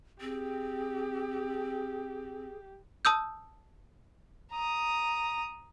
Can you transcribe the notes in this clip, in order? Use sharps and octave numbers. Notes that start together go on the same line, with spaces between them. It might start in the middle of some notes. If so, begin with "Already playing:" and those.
C4 G4 G#4
A5 D#6 E6 G6
A#5 D#6